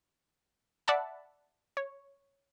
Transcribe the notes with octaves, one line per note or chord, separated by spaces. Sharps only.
D5 E5 F#5 A5 B5
C#5